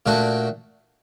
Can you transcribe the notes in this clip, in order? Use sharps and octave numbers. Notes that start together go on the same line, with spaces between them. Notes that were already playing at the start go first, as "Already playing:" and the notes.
A#2 A3 D4 F#4